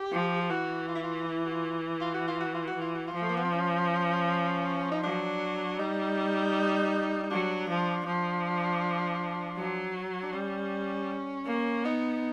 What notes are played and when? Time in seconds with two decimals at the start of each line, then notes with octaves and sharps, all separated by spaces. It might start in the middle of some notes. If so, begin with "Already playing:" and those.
Already playing: G4
0.12 F3
0.41 G4
0.49 E3 F#4
0.88 F4
0.95 E4
1.03 F4
1.25 E4
1.45 F#4
1.51 F4
2.01 F4
2.14 F#4
2.28 F4
2.40 F#4
2.54 F4
2.67 F#4
2.76 E3 F4
2.94 F#4
3.07 F4
3.14 F3
3.21 A3
3.29 A#3
3.37 B3
3.44 C4
3.52 C#4
4.91 D#4
5.03 F#3 D4
5.79 G3 D#4
7.23 D#4
7.30 F#3 D4
7.69 F3
8.06 F3 D4
9.57 F#3
10.22 D4
10.33 G3 C#4
11.46 A#3
11.85 B3 D#4